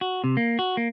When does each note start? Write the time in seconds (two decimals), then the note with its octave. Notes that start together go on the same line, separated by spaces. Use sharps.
0.01 F#4
0.24 C3
0.37 A#3
0.59 F#4
0.77 A#3